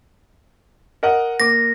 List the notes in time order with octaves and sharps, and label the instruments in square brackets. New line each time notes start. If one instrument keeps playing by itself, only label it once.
[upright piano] A#4 D#5 F#5
[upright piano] A#3 D6 [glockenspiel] A#6